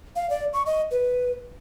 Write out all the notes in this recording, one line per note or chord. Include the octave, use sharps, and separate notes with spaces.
F5
D5
C#6
D#5
B4